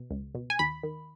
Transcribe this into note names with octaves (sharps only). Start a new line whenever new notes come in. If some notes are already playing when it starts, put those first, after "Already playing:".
Already playing: B2
C#2
B2
G#5
D#2 B5
D#3